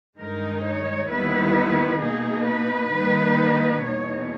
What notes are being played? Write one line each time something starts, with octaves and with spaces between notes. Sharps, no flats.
G2 D#3 G#3 D#4 A#4
C#5
D#2 D#3 G3 B3 E4 B4
B2 A#3 D#4 G#4
B4
D#3 G3 A#3 D#4
E2 B2 A#3 D#4 C#5